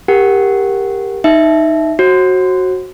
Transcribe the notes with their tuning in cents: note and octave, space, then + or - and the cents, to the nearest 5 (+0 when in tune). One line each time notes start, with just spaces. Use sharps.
G4 +15 A#4 +0 F#5 +10
D#4 +0 E5 +0
F#4 +0 C5 +40